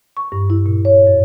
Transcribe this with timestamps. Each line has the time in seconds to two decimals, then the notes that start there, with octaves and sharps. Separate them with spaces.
0.17 C#6
0.32 G2
0.50 E4
0.66 A#2
0.85 C#5
1.07 F#2